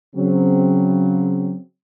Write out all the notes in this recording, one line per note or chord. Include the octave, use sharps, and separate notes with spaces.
C#3 F#3 C4